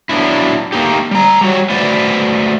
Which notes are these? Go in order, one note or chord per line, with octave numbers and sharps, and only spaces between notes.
F#3 B3 D4 E4
A3 A#3 D#4 G4
G3 A#5
G3 F#4 C#5
A3 F#4 B4 C5 D5